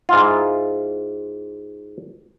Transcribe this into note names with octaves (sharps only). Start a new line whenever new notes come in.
G#2 E4 F4